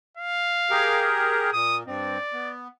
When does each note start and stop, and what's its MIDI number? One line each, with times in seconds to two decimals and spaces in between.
0.17 1.13 77
0.70 1.50 67
0.70 1.50 68
0.70 1.50 70
1.53 1.83 46
1.53 1.77 87
1.87 2.18 43
1.87 2.18 60
1.87 2.53 74
2.33 2.68 59